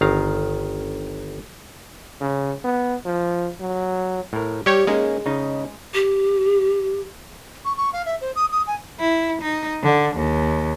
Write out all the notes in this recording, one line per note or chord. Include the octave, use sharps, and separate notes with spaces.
G1 D#3 F5 A#5
C#3
B3
F3
F#3
A2 A#4
G3 G4 C#5
G#3 A#3 C#4 D#4
C#3 D#4
G4
C#6
C#6
F5
E5
C5
D#6
D#6
G#5
E4
D#4
D3
D#2